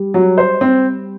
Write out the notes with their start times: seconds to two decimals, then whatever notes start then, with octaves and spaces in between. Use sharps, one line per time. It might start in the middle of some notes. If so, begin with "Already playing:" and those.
Already playing: G3
0.14 F#3
0.38 C5
0.61 C4